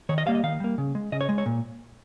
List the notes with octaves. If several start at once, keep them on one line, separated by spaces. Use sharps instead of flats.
D#3 C#5
D#5
G3 A#3 F5
D#5
D#3 F5
G3 A#3
C#3
G#3
C#3 D#5
C#5
G#3
C#5
A#2